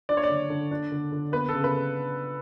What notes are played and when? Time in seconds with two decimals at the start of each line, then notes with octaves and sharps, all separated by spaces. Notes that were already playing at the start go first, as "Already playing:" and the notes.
0.09 D4 D5
0.17 C#5
0.24 D5
0.29 D3
0.50 D3
0.71 D4
0.91 D3
1.12 D3
1.32 B3 B4
1.49 C#3 A4
1.64 B4